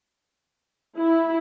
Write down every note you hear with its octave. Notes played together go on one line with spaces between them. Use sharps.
E4